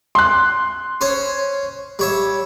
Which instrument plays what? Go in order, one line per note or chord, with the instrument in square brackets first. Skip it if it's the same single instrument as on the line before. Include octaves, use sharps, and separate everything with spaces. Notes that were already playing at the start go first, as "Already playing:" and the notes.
[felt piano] C6 F#6
[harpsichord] C#4 C5 C#5
G3 C#5 E5